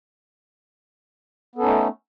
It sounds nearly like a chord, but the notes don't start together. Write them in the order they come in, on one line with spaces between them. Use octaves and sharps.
B3 A4 C#4 D#4 A3